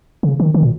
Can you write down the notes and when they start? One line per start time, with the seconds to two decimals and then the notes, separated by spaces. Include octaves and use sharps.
0.23 C#3
0.40 D#3
0.54 D#3
0.63 A#2